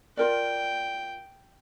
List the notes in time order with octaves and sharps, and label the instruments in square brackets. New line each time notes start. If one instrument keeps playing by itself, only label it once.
[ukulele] F4 A#4 D5 [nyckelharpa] G5